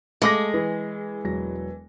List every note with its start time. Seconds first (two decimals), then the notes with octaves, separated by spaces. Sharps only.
0.22 G#3 A3 F5 D6 A#6
0.54 E3 G#4 B4
1.24 E1 F#3 A#6